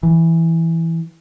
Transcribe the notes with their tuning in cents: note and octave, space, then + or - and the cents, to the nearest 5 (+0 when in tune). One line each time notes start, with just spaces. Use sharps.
E3 +0